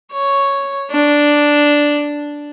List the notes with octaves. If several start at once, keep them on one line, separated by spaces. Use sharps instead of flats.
C#5
D4